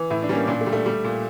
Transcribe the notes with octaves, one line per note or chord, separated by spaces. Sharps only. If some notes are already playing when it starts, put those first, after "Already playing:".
Already playing: E3
A2 E4
D4
G3 C#4
A#3
A#2 D4
A3
G3
A3
G3
A#2